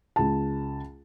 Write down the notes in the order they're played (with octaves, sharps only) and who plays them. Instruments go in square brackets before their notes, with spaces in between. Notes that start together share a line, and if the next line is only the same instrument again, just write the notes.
[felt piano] C#2 A5